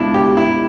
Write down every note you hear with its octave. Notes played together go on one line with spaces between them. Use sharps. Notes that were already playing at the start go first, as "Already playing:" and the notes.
Already playing: C#2 B2 D4 E4
G4
E4